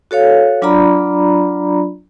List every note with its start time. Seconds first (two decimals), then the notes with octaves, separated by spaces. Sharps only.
0.11 F#4 A4 C#5 F5
0.62 F#3 D4 F4 D5 A#5 B5